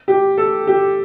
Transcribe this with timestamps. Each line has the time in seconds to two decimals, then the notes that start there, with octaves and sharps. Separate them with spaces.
0.08 G4
0.37 A4
0.67 G4